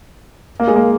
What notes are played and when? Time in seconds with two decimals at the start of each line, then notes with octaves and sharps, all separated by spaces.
0.60 A#3
0.68 G#3
0.76 A#3